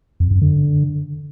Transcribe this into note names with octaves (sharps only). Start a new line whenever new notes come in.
F2
F#2
D3